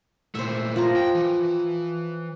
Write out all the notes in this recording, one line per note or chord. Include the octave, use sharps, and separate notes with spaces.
A#2 A3 C5 E5
F3 F4 A#5
G5
E3